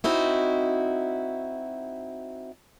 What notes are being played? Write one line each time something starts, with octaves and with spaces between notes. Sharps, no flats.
C4 D#4 E4 F#4